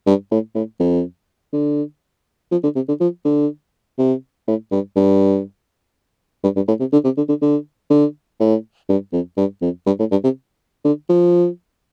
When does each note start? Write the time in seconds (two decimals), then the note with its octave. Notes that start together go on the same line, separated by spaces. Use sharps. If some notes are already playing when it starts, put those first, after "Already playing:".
0.07 G2
0.31 A2
0.55 A2
0.80 F2
1.53 D3
2.52 F3
2.64 D3
2.76 C3
2.88 D3
3.01 F3
3.25 D3
3.99 C3
4.48 A2
4.72 G2
4.96 G2
6.44 G2
6.56 G2
6.68 A2
6.80 C3
6.93 D3
7.05 C3
7.17 D3
7.29 D3
7.42 D3
7.90 D3
8.40 A2
8.89 G2
9.13 F2
9.37 G2
9.62 F2
9.87 G2
9.99 A2
10.12 G2
10.24 C3
10.85 D3
11.09 F3